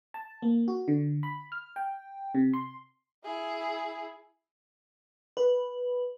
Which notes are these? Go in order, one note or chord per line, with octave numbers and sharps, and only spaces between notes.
A5
A#3
F#4
D3
B5
F6
G5
C3
C6
E4 G#4
B4